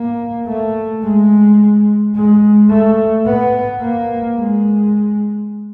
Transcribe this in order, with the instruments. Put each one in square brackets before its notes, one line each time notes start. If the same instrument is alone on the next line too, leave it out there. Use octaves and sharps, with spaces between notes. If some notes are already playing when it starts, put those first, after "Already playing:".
Already playing: [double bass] A#3
A3
G#3
G#3
A3
B3
A#3
G#3